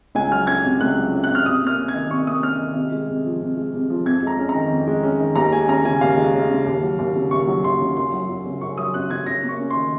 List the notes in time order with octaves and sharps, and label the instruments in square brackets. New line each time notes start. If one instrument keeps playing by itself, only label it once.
[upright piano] C#2 G#5
F#3 F6
C#4 G#6
C3
C#2 F#6
F#3
C#4
F#6
C3
F6
C3 D#6
A#3 F6
C#4
G#6
D#3
C3 C#6
A#3 D#6
C#4 F6
D#3
C3
G#3
C3
F3
C3
G#3
C3
F3
F2 G#6
G#3 A#5
C#4
A#5
D#3
F2
G#3
C#4
D#3
D#2 A#5
G#3 G#5
C#4 A#5
C#3 G#5
D#2 F5
G#3
C#4
C#3
D#2
F#3
D#2
C#3
D#2 C#6
F#3
D#2 C6
C#3
F#2 C6
F#3
F#2
C#3
F#2 C#6
F#3 D#6
F#2 F#6
C#3 G#6
F#2 A#6
A#3
C#6
C#4
D#3 C6